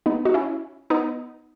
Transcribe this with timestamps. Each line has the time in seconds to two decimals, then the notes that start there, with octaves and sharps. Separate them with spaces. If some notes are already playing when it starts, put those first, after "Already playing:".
0.06 B3 D#4
0.25 D#4 F#4
0.34 C#4 E4
0.90 B3 D#4